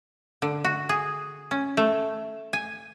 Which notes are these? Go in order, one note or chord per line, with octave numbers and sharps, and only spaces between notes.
D3
F#4
G#4
C#4
A3
G#5